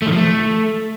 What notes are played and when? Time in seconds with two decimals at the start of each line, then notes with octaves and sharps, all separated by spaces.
0.02 A3
0.07 D#3
0.12 F3
0.17 A3